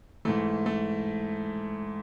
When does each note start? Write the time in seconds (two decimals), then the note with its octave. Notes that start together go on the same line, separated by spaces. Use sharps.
0.25 G#2 E3 A3
0.66 A3